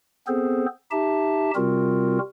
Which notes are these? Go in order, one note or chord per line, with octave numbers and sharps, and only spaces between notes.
B3 C4 G#4 A4 C5
D#4 G4 E5 A5
C3 G3 C4 F4 F#4 A#4